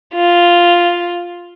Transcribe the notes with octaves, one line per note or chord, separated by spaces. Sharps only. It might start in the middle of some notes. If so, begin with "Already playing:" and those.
F4